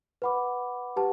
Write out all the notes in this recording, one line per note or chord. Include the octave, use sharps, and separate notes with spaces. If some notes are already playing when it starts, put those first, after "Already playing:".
B4 F#5 B5 D6
G4 B4 F#5 A5